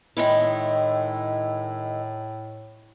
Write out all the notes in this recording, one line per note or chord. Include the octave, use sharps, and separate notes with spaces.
A2 D#3 G#3 E4